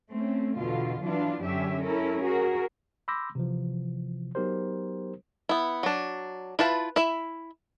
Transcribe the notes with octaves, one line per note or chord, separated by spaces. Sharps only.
A3 C4 C#4
E2 B2 D3 F4
E3 F#3 B3 D4 F4
F#2 D3 C#4 G4 E5
C#4 E4 A4 A#4
F#4 G#4 A#4
B5 C6 D6 E6 G6 A#6
C3 E3 F3
F#3 B3 D#4 G4 A#4 C5
B3 E4
F#3 D4
E4 F4 B4 A5
E4 E5